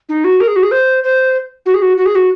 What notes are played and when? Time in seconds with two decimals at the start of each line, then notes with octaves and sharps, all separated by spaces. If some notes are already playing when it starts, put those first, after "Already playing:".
0.09 D#4
0.24 F#4
0.41 A#4
0.48 G#4
0.56 F#4
0.63 G#4
0.71 C5
1.04 C5
1.66 F#4
1.74 G#4
1.82 F#4
1.97 F#4
2.06 G#4
2.15 F#4